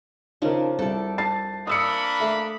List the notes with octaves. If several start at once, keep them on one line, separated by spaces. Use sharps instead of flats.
C#3 F3 D4 D#4 A#4
C2 A4 D5
A5 A6 C7
A#3 D4 B5 D#6 E6 C#7
A3 E5